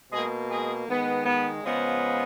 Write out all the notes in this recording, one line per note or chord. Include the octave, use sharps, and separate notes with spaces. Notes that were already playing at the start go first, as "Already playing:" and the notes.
B2 G#3 A#3 G#4
G#3 G#4
D#3 G#3 B3
B3 B4
C#3 F3 G#3 B3